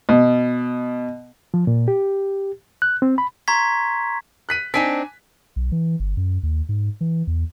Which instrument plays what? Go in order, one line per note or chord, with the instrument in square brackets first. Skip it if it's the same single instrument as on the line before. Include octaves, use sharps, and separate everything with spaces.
[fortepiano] B2
[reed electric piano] F3
A#2
G4
F#6
C4
B5
[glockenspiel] A#5 C6 C#6 G#6 B6
[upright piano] F#6 B6 D#7
[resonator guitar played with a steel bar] C4 D4 D#4 [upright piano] G#5 B6
[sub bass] B1
E3
G1
F#2
D#2
G#2
E3
E2